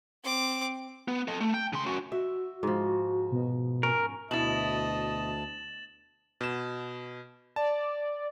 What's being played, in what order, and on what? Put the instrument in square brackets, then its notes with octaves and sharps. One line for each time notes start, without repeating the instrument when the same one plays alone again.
[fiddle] C4 D6
[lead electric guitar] B3
A4 D#5
A3
G5
C#3 C6
C#4 F#4
[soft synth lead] F#4 [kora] E5
[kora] G#2 F3
[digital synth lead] B2
[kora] C#4 [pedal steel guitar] A#4
[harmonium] D2 A5 [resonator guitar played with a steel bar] B2 E4 [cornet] D#5 [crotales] A6 E7 F#7
[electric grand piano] B2 E7
[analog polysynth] D5 [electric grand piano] A5